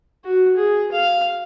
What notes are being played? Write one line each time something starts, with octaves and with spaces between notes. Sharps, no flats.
F#4
G#4
F5